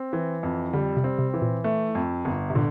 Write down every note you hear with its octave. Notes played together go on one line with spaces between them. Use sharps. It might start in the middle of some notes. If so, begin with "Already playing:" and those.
Already playing: C4
E3
F2
D3 G3
C3
C4
C3
E3
A#2
A3
F2
G1
C3
A#2 D3